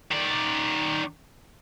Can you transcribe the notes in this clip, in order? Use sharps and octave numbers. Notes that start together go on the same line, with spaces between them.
D#3 D5